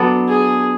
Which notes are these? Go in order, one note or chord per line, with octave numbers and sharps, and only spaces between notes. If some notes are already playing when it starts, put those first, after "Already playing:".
Already playing: F#3 B3 D4 A4
G#4